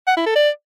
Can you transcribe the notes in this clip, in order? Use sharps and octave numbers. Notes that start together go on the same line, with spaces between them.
F#5
E4
A4
D5